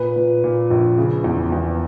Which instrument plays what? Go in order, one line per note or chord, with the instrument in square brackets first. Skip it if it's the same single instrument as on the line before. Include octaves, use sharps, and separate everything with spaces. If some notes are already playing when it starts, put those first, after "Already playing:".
Already playing: [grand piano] A#2 B4
A#2
A#2
A#1
C#3
E2
E2